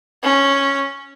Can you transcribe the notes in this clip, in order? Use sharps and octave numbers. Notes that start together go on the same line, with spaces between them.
C#4